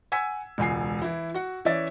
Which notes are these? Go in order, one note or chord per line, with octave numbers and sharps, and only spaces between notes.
F#5 G#5 E6 G#6 B6
E1 C#2 G#5 C7
E3 E4
F#4 F#5
E3 C#4 D5 E5 A6